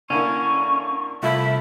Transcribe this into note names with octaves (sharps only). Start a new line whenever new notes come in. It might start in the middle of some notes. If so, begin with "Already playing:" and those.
D3 A#3 C#4 E4 C#6
C2 A3 E4 F4 E5